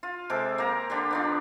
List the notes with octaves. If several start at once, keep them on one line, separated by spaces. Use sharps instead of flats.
F4
C3 G#3 A4 D6
A#3 G4 A#5
D3 D4 G4
B3 D4 F4